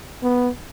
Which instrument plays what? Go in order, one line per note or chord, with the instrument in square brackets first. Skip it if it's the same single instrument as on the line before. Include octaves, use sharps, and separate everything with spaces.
[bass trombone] B3